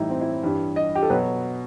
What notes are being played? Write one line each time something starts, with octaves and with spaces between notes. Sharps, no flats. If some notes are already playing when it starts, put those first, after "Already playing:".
Already playing: A2 E3 G3 D#4 E4
C4
E4
G2 E3 G3
D#5
G4
A4
B2 F#3 B4